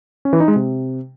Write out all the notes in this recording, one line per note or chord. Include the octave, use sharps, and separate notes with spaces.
C#4
E3
D#4
G#3
C3